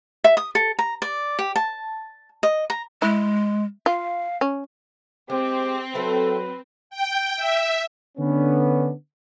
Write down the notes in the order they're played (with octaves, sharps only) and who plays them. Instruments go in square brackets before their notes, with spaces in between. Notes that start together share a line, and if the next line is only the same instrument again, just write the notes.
[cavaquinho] E5
D#6
A4
A#5
D5
G4
A5
D#5
A#5
[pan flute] G#3 [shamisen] E4
[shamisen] F4 [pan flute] F5
[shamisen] C#4
[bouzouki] G#3 [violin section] C4 [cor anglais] G4 [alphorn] C5
[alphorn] F#3 [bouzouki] A3 E4 A4 [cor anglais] B4
[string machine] G5
E5
[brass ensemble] D3 B3 C#4 D4